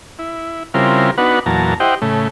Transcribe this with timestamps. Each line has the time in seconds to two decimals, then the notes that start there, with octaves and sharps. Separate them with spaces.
0.19 E4
0.74 C#3 G3 C4 E4 F4 A#4
1.18 B3 D4 D#4 F#4 B4 F#5
1.46 E2 A#2 F#3 A5 A#5
1.80 E4 G4 C5 D#5 F#5 G5
2.02 A2 C#3 A3